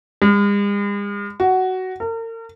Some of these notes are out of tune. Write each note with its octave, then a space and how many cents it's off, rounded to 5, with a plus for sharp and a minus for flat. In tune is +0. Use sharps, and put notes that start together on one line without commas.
G#3 -45
F#4 +10
A#4 -40